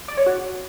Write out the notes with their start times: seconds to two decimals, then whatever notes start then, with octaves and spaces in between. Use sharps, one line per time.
0.08 D5
0.17 C#5
0.26 F#4